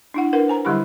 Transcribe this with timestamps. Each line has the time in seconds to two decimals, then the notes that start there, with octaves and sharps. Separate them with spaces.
0.14 D4 E4 F#5
0.33 D4 A#4 B4 F#5
0.48 C5 G#5 A#5
0.65 D3 F#3 G3 E4 G4 B5